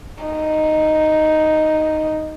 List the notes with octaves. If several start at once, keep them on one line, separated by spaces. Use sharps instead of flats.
D#4